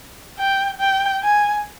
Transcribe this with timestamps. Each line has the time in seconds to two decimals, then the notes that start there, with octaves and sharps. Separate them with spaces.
0.39 G5
0.80 G5
1.23 G#5